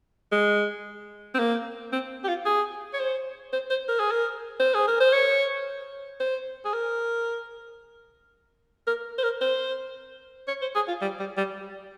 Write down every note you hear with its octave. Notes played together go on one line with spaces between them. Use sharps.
G#3
C4
A#3
C4
G4
F4
G#4
C#5
C5
C5
C5
A#4
G#4
A#4
C5
G#4
A#4
C5
C#5
C5
G#4
A#4
A#4
C5
A#4
C5
C#5
C5
G#4
F4
G3
G3
G3